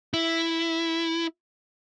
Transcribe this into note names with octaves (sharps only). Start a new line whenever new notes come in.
E4